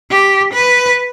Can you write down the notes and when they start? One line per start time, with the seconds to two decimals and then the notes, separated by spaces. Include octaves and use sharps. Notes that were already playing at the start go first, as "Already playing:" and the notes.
0.11 G4
0.54 B4